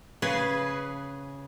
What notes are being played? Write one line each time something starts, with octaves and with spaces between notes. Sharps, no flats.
C#3 G#4 B4